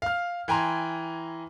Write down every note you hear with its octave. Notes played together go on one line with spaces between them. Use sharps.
F5 F6
E3 G5 G#5 A#5 C6